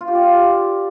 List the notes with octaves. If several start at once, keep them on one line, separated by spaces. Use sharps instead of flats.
F4
G4
D5
F5